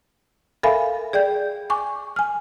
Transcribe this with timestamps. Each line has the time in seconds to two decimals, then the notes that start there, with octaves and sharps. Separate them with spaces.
0.63 A4 A#4 E5 F5 G#5 B5
1.13 G#4 D5 G5 G6
1.70 G#5 C#6 D6
2.16 G#5 F6